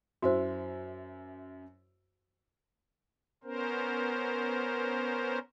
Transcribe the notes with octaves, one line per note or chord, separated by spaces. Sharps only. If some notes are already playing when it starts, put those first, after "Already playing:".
F#2 E4 F#4 C5 E5
B3 C#4 A#4 C5